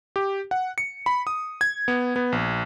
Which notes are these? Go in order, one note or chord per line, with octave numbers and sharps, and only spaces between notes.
G4
F#5
C#7
B5
D#6
G#6
B3
B3
A#1